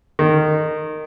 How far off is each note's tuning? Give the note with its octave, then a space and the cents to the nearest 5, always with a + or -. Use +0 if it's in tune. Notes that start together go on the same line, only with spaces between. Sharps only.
D#3 -15